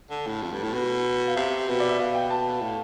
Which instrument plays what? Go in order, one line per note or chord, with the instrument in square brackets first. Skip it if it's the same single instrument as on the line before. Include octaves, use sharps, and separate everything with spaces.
[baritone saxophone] D3
A2
F2
G2
A2
B2
[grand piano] F5
[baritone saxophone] C3 [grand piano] E5
[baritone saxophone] B2
[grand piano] D5
E5
[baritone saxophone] B2 [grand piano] F5
[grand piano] G5
A5
[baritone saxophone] A2